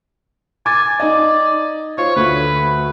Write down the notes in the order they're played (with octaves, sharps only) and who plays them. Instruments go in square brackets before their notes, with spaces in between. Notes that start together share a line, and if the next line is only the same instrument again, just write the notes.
[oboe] G#5 [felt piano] D6 A6
[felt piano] D#4 D#5 [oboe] D5
[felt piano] F4 C5 [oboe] C#5
[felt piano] D2 [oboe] B4